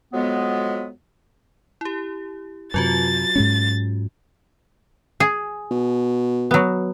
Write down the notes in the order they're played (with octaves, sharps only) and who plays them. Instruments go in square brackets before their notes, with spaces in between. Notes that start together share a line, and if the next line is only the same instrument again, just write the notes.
[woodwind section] F2 F#3 G#3 B3
[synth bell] E4 G4
[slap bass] F#2 C3 [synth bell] F#3 F4 F#4 [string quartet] A6
[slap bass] G#2 G#3 C#4
[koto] G#4
[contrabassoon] B2
[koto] F#3 B3